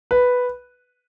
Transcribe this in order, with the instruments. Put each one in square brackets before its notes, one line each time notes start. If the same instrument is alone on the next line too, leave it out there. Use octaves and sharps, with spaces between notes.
[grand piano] B4